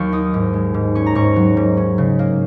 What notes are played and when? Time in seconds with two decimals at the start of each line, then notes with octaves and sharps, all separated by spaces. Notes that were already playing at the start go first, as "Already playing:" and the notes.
Already playing: D#2 F#3 C#6
0.12 D#4 D#6
0.34 G#2
0.53 G#3
0.74 G#2
0.95 C#4 C#6
1.06 A#5
1.15 G#2 C#6
1.36 F#3
1.57 G#2
1.77 C#4
1.98 C#3
2.19 A#3